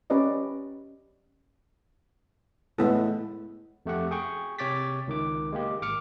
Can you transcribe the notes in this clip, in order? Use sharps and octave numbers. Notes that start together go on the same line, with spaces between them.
C#4 G4 B4 D5 D#5
A2 G#3 B3 A4
F2 A3 G4 F#5
G#4 G5 C#6
C3 C#5 G5 D6 A6 B6
C#2 D#3 D6
G#3 A#3 G4
G#1 D6 F6 C#7